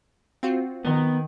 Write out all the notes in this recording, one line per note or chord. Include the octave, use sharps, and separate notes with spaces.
C4 F4 F#4
D#3 B3